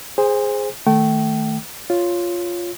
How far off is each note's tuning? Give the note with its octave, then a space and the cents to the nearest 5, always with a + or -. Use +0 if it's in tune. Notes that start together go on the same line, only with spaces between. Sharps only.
G#4 +0 C5 +0 G#5 -40
D#3 +0 A3 +0 G5 -30
F4 +0 C#5 +0